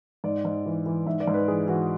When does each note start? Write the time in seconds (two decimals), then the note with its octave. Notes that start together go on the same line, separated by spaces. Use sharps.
0.24 G#2 D5
0.45 G#2
0.66 E3
0.86 E3
1.06 G#2 E5
1.20 D5
1.28 G#2
1.34 B4
1.48 E3 G#4
1.68 E3 F#4